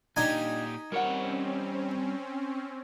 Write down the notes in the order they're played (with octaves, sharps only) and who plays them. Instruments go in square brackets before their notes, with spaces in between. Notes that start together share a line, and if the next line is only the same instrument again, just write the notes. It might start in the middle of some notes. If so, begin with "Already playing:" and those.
[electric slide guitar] A#2 G4 [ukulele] D4 D#5 A#5 [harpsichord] D#4 G#5
[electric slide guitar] G3 C#5 [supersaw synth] C4 C#4 [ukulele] A#4 F#5